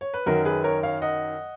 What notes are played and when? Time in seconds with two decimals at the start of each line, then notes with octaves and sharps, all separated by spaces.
0.01 C#5
0.14 B4
0.26 F#2 D#3 F#3 F#4 A#4
0.45 G#4 B4
0.64 A#4 C#5
0.83 C#5 F5
1.02 D#5 F#5